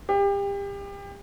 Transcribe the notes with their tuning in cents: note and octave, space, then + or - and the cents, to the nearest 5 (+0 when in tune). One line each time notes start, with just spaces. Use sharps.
G4 +30